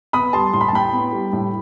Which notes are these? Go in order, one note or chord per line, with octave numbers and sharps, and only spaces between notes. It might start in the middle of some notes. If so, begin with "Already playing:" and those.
B3 B5 D#6
G3 A5 C6
A2 C6
B5
A5
A2 G5 B5
B3
G3
A2